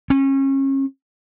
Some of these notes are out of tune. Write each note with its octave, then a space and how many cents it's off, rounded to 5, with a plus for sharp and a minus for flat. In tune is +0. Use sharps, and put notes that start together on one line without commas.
C#4 -30